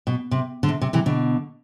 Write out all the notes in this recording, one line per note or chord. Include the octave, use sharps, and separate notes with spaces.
B2
C3
D3
C3
C3
C3 E3
B2 D3